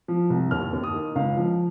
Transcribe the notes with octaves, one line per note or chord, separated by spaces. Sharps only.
F3
C2
D#2 F6
D#2
D#6
D#3
C#2 F5
F3